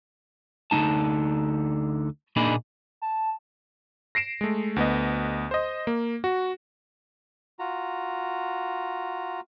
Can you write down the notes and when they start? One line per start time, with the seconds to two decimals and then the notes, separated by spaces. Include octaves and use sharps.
0.71 D2 D3 A#3 D#4 A5
2.36 A#2 A#3 D4 D#4 G#4 B5
3.02 A5
4.15 A#6 C7 D7 E7
4.41 G#3 A3
4.76 D2 B3 D#5
5.51 C5 D#5
5.87 A#3
6.24 F#4
7.59 F4 F#4 A#5